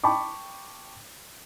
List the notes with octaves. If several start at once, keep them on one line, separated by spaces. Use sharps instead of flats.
G5 A5 B5 C#6 D6